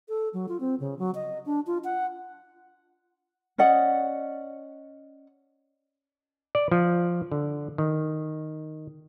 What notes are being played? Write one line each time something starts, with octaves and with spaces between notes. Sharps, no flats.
A4
F#3
F4
C4
C#3
F#3
D#5
D4
F4
F#5
C#4 D5 D#5 F#5
D5
F3
D3
D#3